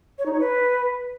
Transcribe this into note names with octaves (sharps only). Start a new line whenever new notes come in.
C#5
D#4
C#5
B4